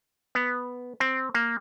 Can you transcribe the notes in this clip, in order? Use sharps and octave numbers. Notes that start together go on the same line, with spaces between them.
B3
C4
A#3